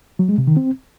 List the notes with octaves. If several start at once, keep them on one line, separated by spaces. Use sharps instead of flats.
F#3
G#3
C3
D#3
C4